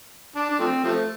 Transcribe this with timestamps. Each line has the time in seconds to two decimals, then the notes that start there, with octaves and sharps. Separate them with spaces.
0.36 D4
0.49 D4
0.59 F3 A3 C4
0.84 C3 F3 A3